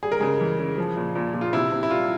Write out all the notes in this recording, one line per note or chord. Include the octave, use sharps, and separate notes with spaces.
G3 G#4
A#4
C#3 G#3 G#4
E3
C#3
F3
A#2
A#2
A#2
F4
C3 E4
C3
E4
G3 F4